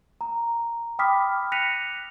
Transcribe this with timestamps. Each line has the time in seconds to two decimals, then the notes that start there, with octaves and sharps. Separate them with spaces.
0.21 A#5
0.99 G5 B5 D6 D#6 F6 B6
1.52 F#6 A#6 B6 C#7 D#7 F7